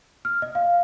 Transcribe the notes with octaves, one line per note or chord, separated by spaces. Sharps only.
F6
D#5
F5